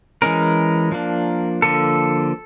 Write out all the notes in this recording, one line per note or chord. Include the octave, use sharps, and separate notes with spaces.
E3 G#3 C#4 A#4
F3 A#3 D4
D3 F3 A#3 A4